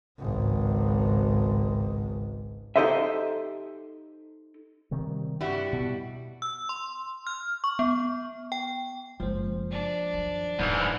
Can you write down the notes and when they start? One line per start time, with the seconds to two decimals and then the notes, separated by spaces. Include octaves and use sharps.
0.19 G#1 C#2
2.76 D#4 G4 A4 C5 D#5 E5
4.91 C3 D#3 G3
5.41 G2 G3 E4 F#4
5.73 B2
6.42 E6
6.69 C6
7.27 F6
7.64 C#6
7.79 B3
8.52 G5
9.20 F#1 F3 G#3 C5
9.71 D4
10.14 F#2 D#3
10.59 D1 F2 G#2 E3